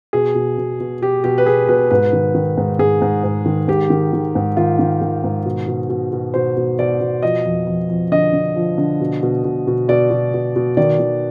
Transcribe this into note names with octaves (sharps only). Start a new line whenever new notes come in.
B2 G#4
B2
B2
B2
B2 G4
B2 G4
B4
B2 G#4
B2 B4
G#2 B4
D#3
D#3
G#2
G#2 G#4
G#2
G#2
D#3
G#2 G4
D#3
D#3
G#2
D#3 F4
D#3
D#3
G#2
B2
B2
B2
B2
B2 C5
B2
B2 D5
B2
F3 D#5
F2
F2
F2
D3 D#5
D3
F3
D3
B2
B2
B2
B2
B2 D5
B2
B2
B2
D#3 D5
D#3